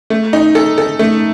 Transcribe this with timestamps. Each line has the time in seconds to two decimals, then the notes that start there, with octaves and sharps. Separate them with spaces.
0.10 A3
0.33 D#4
0.55 A4
0.78 A4
0.99 A3